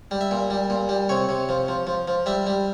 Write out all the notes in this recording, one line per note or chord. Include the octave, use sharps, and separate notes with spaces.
G3
E5
A#2
G3
A#2
G3
C3 C#5
C3
F3
F3
F3
F3
G3 E5
G3